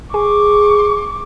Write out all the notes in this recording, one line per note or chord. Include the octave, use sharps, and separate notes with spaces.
G#4 C#6 D6